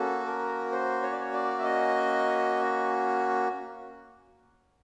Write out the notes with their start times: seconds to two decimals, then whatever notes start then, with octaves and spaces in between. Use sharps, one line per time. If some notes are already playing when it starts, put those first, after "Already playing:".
Already playing: A#3 C#4 F#4 A4
0.25 A#4
0.72 C5
1.02 C#5
1.11 D5
1.20 C#5
1.32 D5
1.59 E5
1.64 D#5